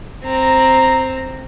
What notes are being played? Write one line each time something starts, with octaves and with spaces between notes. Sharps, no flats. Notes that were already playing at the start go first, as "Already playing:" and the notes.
C4 A#5